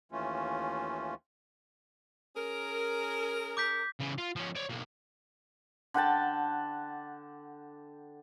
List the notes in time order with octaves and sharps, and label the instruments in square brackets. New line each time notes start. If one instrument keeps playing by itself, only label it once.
[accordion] D#2 E3 A3 C#4 F4
[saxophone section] C#4 G#4 A#4
[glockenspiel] D6 G6 B6
[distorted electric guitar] C#3 E3
F4
F3 C#4
C#5 D5
B1 A#3
[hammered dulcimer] D3 F#5 G5 A5